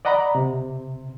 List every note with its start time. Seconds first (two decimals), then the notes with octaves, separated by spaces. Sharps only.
0.05 D5 D#5 F#5 A#5 B5
0.35 C3